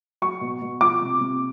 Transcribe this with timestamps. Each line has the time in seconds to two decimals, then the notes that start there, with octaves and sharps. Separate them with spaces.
0.22 F#3 C#6
0.41 B2
0.62 B2
0.81 F3 D6
1.01 C3
1.21 C3